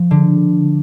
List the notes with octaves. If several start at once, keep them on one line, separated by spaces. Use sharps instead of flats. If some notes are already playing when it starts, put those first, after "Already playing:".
Already playing: F3
D3